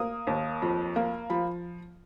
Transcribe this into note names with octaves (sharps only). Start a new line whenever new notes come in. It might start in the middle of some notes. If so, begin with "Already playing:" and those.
Already playing: A#3 D#6
D#2
F2
A#3
F3 B5